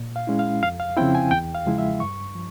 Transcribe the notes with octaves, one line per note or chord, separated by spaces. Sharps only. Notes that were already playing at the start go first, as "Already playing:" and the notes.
Already playing: A#2
F5
G#3 C#4 E4
F5
F2 F5
F5
C#3 F3 C4 E4 G5
G#5
E2 G5
F5
C#3 F3 G#3 E4
E5
G2 C#6
F3